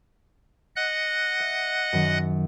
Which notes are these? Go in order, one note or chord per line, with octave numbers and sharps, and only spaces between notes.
D#5 F#5 F#6
E5
F#2 D#3